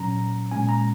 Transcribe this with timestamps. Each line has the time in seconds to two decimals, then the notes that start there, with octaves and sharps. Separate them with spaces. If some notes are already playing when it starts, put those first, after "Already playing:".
Already playing: A#2 F#3 C#4 A#5
0.51 A#2 G#3 C#4 G#5
0.69 A#5